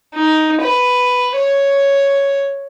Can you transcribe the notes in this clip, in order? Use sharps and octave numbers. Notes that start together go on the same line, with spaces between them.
D#4
B4
C#5